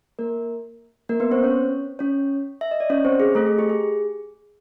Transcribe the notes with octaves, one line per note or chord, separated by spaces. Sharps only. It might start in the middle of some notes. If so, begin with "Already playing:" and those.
A#3 A#4
A#3 A#4
B3 B4
C4 C5
C#4 C#5
C#4 C#5
E5
D#5
D5
C#4 C#5
C4 C5
G#4
A3 A4
G#4
G4
G#4